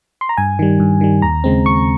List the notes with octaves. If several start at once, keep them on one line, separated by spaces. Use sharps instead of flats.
C6
A#5
G2 G#5
D#3 G3
G2
D#3 G3
D#2 A#5
C#3 G#3 C4
D#2 C#6